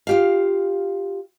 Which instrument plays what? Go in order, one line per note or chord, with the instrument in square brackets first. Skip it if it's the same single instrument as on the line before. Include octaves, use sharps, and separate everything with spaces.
[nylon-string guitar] F4 G4 F5